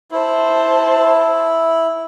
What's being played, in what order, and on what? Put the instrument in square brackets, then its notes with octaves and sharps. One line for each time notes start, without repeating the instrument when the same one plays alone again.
[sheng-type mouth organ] E4 [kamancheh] C5 A5